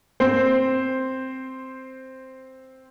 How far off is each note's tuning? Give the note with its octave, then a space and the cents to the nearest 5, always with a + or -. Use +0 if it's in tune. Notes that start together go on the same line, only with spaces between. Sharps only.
C4 +0 C5 +0